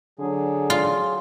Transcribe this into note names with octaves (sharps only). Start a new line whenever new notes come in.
D3 F#3 G#4
F4